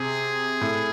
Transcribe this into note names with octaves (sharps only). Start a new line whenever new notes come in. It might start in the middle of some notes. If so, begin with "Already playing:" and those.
Already playing: C3 G#4
A2